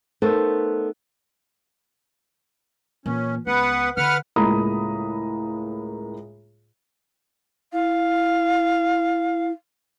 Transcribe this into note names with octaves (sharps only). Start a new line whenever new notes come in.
A3 B3 D#4 A4 A#4 C5
A#2 E3 C#4
C#2 B3 B4 F#5
D3 B4 F#5 F6
C#2 A2 A#3 A#5 B5 D#6
E4 F5